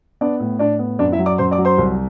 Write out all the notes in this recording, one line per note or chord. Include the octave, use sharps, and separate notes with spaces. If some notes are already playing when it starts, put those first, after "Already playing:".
B3 D4 D5
A2
A2 D4 D5
B3
F#2 D4 D5
E4 E5
F#3
D5 D6
F#2 C5 C6
D5 D6
F#3
C5 C6
C2